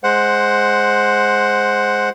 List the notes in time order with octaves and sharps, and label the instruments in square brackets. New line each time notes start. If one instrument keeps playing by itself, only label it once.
[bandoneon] G#3 C5 F#5